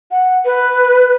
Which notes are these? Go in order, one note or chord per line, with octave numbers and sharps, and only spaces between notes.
F#5
B4